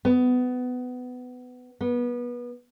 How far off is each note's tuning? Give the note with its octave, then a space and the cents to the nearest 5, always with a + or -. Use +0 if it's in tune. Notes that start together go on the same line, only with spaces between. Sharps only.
B3 +20
B3 -25